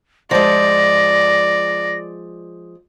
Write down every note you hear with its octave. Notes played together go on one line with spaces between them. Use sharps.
F3 G#3 D5 A#6